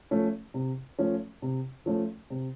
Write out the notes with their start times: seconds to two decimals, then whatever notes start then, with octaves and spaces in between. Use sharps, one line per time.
0.11 F3 A3 C#4
0.54 C3
0.98 F3 A3 C#4
1.42 C3
1.86 F3 A3 C#4
2.30 C3